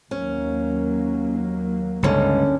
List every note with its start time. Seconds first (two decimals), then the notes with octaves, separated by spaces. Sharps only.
0.11 D#2 F#3 A#3 C#4
2.03 C#2 G2 D3 C#4